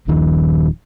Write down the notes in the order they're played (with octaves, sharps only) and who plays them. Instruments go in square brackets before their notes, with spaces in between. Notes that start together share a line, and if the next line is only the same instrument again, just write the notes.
[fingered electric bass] D#1 D#2 D#3 F3